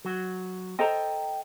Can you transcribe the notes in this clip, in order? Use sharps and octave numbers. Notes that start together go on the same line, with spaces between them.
F#3 F#4
A4 C5 D#5 G5 A#5